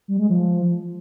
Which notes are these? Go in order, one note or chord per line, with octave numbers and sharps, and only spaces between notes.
G3
G#3
F3